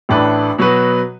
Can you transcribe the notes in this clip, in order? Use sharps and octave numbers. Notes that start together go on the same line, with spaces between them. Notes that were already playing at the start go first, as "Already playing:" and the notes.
A1 A2 A3 D4 B4
B2 F#3 B3 F#4 B4